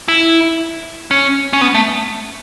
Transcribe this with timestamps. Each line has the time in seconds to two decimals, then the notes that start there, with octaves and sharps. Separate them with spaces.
0.08 E4
1.11 C#4
1.53 C#4
1.61 B3
1.74 A3